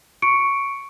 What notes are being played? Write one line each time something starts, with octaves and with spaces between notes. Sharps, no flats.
C#6 C#7 D7